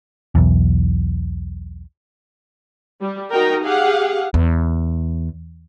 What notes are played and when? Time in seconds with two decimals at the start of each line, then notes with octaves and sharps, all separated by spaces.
0.35 B1 E2
3.01 G3
3.31 D#4 F#4 A#4 G5 A#5
3.64 G4 G#4 F5 F#5
4.34 E2